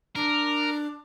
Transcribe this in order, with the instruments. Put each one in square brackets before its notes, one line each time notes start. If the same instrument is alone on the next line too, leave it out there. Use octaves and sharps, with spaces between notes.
[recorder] D4 [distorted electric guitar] A#4